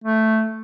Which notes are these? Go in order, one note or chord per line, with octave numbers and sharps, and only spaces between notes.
A3